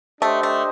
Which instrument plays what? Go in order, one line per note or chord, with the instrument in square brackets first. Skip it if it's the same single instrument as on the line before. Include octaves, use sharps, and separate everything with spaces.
[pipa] A3 [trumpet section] D4 G4 C5 D#5
[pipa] A3